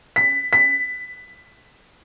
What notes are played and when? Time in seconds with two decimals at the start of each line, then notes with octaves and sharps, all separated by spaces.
0.16 B6
0.53 B6